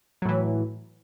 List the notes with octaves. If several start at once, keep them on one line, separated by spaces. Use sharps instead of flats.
A2 E3 F#3